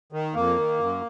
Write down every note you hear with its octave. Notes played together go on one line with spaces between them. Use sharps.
D#3
F2 A#3
D#3
F#2